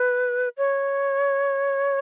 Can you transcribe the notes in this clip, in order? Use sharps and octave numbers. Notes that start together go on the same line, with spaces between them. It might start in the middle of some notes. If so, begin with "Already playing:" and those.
Already playing: B4
C#5